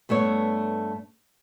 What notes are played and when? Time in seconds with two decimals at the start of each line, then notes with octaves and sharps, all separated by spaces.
0.09 G2 A3 B3 C#5